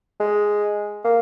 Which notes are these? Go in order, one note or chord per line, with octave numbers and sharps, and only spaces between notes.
G#3
A#3